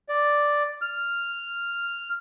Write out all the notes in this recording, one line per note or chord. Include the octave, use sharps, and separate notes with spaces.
D5
F6